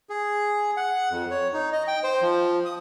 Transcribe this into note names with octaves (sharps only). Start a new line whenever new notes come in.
G#4
F#5
F2
C#5
D#4
D#5
G5
C5
F3
D#6